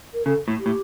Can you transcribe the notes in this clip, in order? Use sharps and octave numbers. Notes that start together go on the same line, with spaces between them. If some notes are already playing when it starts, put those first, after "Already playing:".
A#4
C#3 A4
A2
G4
A2